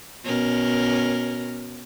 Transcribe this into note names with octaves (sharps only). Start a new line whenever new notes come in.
B2 C#4 A#4